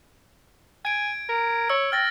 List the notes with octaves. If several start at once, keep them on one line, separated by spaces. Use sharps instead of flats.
G#5 G#6 D7
A#4
C#5 E6
G5 F6 A6 A#6